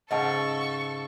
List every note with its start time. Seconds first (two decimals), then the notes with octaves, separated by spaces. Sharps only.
0.11 G#2 C#3 A4 D#5 F#5 A5 C#6